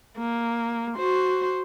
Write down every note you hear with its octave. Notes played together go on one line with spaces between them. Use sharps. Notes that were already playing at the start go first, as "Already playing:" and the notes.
A#3
F#4 C5